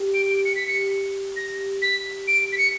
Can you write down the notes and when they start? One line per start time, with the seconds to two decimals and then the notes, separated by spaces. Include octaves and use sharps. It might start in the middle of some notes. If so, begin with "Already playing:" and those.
Already playing: G4
0.14 D7
0.29 D7
0.45 C#7
0.55 B6
0.68 C#7
1.36 A#6
1.82 B6
2.28 D7
2.53 B6
2.58 C#7